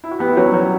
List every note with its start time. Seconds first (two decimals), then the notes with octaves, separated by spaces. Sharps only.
0.04 E4
0.11 F#4
0.19 B3 G4
0.28 E4
0.36 F#3 C#4
0.45 G3
0.54 F#3